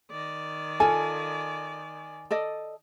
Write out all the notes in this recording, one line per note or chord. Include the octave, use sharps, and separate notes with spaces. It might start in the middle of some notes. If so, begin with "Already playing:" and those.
D#3 D5
F4 A4 G#5
A4 D5 D#5